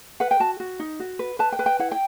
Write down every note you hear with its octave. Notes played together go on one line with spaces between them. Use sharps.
B4 F#5
G5
F#4 A5
F#4
D#4
F#4
B4
B4 A5
G5
B4
G5
E4 F#5
G5